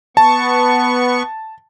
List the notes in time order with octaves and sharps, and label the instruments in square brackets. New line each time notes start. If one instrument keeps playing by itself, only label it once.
[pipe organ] B3 C#6 [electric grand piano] A5